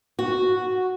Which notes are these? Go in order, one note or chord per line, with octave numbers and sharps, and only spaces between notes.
F#4